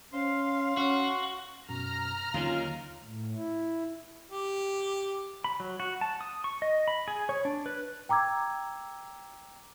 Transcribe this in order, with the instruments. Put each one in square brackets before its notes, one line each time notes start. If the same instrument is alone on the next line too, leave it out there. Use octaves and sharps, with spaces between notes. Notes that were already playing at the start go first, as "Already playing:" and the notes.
[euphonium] C#4 [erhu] F5 [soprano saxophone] C6
[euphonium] C#4 [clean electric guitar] F#4
[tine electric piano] F#2 B2 [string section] A#5 F6
[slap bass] D#2 D#3 [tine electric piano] D3 F#3 [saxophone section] C#4 F4
[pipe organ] A2
E4
[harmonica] G4
[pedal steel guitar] B5
F#3
F#4
A5
D#6
C#6
D#5
B5
G#4
C#5
D4
B4
[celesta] G5 A#5 D6 E6 G#6